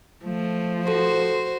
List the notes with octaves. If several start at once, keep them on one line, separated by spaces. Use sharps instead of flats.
F3 A3
F#4 A4 C5 C6